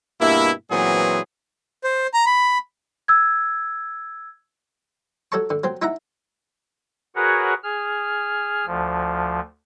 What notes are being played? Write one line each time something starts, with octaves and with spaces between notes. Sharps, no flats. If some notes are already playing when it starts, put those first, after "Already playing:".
G2 B2 A#3 E4
A#2 E3 F#3 B3 C4 G#4
C5
A#5
B5
E6 G#6
F#3 A4 D5 A5 C#6
D3
F#3 C4
D#4 E4 E5 F#5 A#5
F#4 G#4 A#4 B4 C#5 F#5
G#4 F6
D2 F3